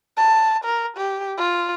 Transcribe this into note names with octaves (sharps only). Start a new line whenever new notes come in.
A5
A#4
G4
F4